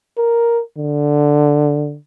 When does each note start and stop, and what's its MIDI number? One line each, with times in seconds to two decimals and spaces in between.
0.17 0.61 70
0.77 1.97 50